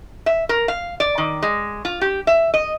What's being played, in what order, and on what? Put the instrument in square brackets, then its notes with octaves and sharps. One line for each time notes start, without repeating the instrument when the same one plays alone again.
[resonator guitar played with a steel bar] E5
A#4
F5
D5
D#3
G#3
F4
G4
E5
D#5